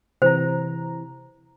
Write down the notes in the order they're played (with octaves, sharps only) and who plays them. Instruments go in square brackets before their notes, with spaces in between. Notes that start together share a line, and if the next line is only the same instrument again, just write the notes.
[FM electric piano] C3 E3 A#5 [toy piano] C5